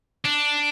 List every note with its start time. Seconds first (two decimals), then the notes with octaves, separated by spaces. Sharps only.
0.25 D4